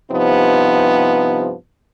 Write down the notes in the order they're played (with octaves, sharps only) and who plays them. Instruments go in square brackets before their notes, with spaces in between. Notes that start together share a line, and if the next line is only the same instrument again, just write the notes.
[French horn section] G2 C3 F3 B3 D#4